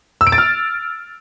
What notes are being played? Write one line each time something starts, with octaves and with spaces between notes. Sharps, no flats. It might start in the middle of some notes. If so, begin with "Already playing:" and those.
E6
D7
A6
F6